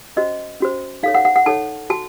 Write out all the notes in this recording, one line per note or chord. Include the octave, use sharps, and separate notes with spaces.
C#4 F#4 C5 D#5
C#4 F#4 C5
D#4 A4 C#5 F5
F#5
F#5
F#5
D#4 A4 C#5 A5
F#4 A5